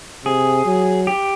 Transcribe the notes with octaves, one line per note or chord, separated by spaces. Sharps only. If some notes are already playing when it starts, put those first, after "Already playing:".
C3 G#4
F#3
G4